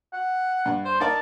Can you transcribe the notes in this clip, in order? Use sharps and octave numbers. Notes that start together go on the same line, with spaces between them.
F#5
G2
C5
D#4 A#4 D5 A5